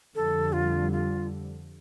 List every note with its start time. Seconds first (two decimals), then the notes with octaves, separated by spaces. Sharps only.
0.15 F2 D3 G3 A4
0.53 F4
0.92 F4